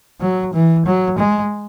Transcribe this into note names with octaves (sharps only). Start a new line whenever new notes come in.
F#3
E3
F#3
G#3